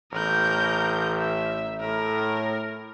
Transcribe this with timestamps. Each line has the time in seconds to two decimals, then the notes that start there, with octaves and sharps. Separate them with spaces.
0.13 A1 A#4 G6
1.18 E5
1.81 A2 A#4